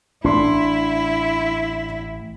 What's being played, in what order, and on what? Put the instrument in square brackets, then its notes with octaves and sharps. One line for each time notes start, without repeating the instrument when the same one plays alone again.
[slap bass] A1 [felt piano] D4 C6 [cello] E4